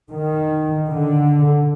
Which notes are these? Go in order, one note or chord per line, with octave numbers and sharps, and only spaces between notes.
D#3
D3